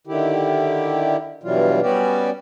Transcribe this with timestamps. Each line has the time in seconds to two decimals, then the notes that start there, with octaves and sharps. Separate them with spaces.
0.07 D3 D#3 E4 G4
1.43 G2 B2 E3 F#3 G3 F4
1.82 G3 B3 C#4 F#4 G4 D5